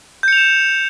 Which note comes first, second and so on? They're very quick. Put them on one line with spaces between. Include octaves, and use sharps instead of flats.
G6 C#7 F7 E7